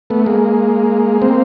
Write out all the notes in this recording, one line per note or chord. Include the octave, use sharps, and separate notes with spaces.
A3 B3
G#3 A#3
A#3 C4